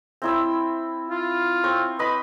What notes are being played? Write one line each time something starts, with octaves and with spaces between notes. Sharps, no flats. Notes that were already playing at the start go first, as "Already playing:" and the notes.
C4 E4 E6
F4
C4 C#6
B4 D#5 B5